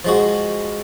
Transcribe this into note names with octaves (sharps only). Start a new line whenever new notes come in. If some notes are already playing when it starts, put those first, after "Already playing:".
F3 G#3 F#4